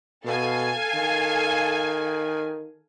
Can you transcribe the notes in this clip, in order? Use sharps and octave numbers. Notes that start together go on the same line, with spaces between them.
B2 A4 F5 G#5
D#3